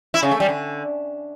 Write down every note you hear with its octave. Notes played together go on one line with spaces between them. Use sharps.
E4
C#3
A3
G3
D3